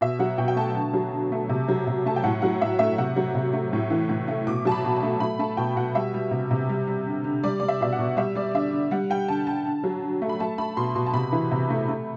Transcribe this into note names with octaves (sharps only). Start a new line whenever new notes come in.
B2 E5
F#3 F#5
B2 G5
G5
A3 A5
D3
F#3
D3
A3
C3
F#3
C3
A3 A5
G5
A2 F#5
F#3 F#5
A2 E5
A3 E5
C3 F#5
F#3
C3
A3
A2
E3
A2
A3
B2 D6
F#3 A5
B5
B2
A5
A3
A3 B5
A3 A5
B2 G5
B2 F#5
G3 E5
G3
C3
C3
G3
G3
D3
D3
G3 D5
G3 D5
E5
B2 E5
F#5
B2
G3 E5
G3 D5
D3 E5
D3
G3 F#5
G3 G5
D3 A5
D3 A5
D3
F#3
D3
A3
B5
A3 A5
A3 B5
B2 C6
B2 C6
A5
C3 B5
E3
C3
A3
A3